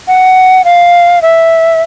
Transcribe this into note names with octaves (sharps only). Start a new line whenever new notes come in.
F#5
F5
E5